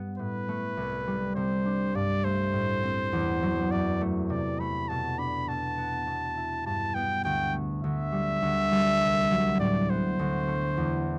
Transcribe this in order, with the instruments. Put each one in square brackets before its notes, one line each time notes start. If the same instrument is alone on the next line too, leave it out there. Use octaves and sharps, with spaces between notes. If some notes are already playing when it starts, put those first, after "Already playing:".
Already playing: [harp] G2 B3
[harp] A2 [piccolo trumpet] B4
[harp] A3
C2
G3
[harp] C3 [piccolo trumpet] C5
[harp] D4
[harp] G2 [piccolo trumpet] D5
[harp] A3 [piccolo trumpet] C5
[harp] A2
C4
E2
F#3
[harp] F#2 [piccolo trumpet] D5
[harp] A3
[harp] C3 [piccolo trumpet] D5
[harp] A3 [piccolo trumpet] B5
[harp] B2 [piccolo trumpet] A5
[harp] D4 [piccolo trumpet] B5
[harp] B2 [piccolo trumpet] A5
[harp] B3
B2
E4
[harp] G2 [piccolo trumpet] A5
[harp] B3 [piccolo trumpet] G5
[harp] D2 [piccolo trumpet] G5
[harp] A3
[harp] D2 [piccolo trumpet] E5
[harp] G3
D2
G3
C2
F#3
[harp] A2 [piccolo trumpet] D5
[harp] B3 [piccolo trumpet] C5
[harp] D2
A3
E2